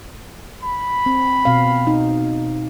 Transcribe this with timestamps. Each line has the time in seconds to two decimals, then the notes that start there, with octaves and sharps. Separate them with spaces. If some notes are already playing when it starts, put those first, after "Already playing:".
0.63 B5
1.06 C4
1.45 B2 C4 F5
1.87 D#4